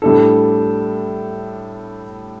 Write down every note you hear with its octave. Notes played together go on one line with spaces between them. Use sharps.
A2 G3 D4 A4